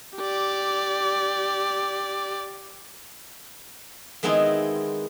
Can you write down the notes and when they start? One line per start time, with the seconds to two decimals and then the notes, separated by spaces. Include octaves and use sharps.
0.17 G4 D5
4.23 D#3 G#3 B3 C4 D#4 E4